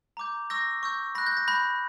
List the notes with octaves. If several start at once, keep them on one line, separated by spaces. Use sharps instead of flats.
A#5 D6 G6
C#6 E6 G6 A#6
C#6 E6 G6
B5 F#6 A#6
G6
A#6
B5 F#6 G6